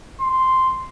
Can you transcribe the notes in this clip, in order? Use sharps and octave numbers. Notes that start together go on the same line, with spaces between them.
C6